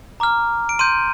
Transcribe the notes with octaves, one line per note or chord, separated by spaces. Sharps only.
A#5 D6 F6
D7
C6 G6 D#7